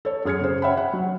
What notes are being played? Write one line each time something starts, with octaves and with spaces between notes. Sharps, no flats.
A4 C#5
F#2 G#4 F6 G#6 C#7
C#3 G#4 C5
C#5 E5 F#5 G5 B5
F#5
F#3